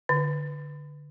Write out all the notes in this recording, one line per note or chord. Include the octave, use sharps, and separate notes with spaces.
D3